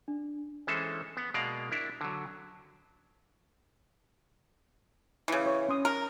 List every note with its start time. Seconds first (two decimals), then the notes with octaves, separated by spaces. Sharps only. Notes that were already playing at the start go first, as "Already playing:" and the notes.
0.08 D4
0.67 E3 G#3 C#4 A4 C5 E5
1.17 B3
1.34 B2 G#3 A#3 D5 F5 A#5
1.71 D4 E4 A#4
2.01 D3 F#3
5.28 C#3 E3
5.46 C#5
5.69 C#4 C6 D#6
5.85 A#4